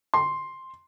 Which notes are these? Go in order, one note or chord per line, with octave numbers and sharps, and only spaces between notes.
C6